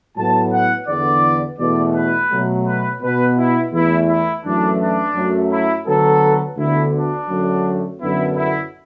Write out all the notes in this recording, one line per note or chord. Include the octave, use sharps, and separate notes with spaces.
A2 F#3 B3 A5
F#5
E2 D3 B3 D5
E2 B2 A3 D5
B4
B2 F#3 A3
B4
B2 B3 B4
E4
E2 E3 A3 E4
E4
F#2 E3 A3 D4
D4
F#2 F#3 A3
E4
D2 D3 F#3 B3 A4
D2 D3 B3 E4
D4
F#2 D3 F#3 A3
F#2 D3 B3 E4
E4